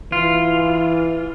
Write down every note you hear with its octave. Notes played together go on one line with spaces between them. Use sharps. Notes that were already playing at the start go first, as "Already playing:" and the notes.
E3 F4